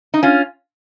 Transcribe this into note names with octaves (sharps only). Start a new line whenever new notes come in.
D#4
C#4 F4